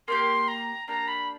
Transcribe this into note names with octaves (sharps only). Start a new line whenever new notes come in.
A#3 D4 G4 C6
A#5
A#3 D4 G4 A#5
B5